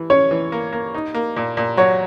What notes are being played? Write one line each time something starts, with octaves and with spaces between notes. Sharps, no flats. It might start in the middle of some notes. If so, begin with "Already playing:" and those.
Already playing: E3
C#4 C#5
E3
A#3
A#3
D#4
A#3
A#2
A#2
F#3 C#5